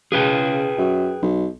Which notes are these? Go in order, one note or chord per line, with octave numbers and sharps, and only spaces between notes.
C#3 G#4 B4 G5
F#2
B1